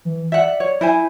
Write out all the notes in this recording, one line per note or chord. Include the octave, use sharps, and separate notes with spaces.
E3
D5 E5 F#5
C#5
E4 C5 G#5